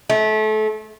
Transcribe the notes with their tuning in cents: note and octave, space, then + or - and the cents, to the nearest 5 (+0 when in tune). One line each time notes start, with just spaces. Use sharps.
A3 -30